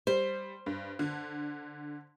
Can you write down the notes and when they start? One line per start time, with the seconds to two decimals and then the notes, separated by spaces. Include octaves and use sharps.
0.07 G3 C5
0.66 G2
0.99 D3